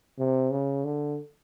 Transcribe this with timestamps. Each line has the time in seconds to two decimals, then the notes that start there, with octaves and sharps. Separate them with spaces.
0.19 C3
0.51 C#3
0.84 D3